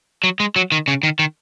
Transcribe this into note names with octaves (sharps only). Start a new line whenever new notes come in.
F#3
G#3
F#3
D#3
C#3
D#3
D#3